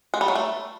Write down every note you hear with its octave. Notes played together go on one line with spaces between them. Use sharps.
G#3
G3
F#3
A3